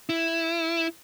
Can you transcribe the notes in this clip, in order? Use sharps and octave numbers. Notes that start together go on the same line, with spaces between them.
E4